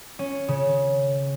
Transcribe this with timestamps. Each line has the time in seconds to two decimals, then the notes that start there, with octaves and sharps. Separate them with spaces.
0.19 C#4
0.48 C#3